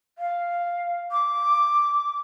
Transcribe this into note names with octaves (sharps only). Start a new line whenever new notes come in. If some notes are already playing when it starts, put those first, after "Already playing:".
F5
D6